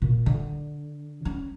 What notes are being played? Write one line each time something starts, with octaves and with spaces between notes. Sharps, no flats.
A#2
D3
C#4